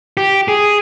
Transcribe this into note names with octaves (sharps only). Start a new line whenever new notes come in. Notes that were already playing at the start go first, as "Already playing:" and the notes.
G4
G#4